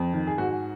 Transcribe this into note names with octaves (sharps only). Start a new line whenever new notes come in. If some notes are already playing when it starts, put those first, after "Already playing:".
Already playing: F2
D#3
G#4
G#2 F#4